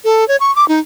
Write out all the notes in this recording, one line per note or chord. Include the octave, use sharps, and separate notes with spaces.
A4
C#5
C#6
D6
D#4